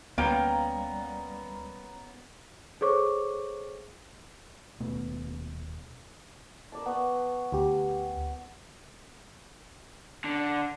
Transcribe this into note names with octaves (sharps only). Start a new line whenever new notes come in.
D2 G3 A#3 B3 C#4 F5 G5 A#5
G#4 A4 C5 C#5 C#6 D6
D#1 B2 A3 B3
A#4 D5 A5
B3 C#6 E6
D2 G4
D3